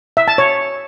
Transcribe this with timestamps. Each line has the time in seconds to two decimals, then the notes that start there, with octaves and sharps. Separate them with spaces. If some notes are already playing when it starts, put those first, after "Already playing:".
0.17 E5
0.28 A5
0.38 C#5